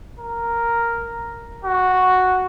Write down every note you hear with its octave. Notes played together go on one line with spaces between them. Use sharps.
A#4
F#4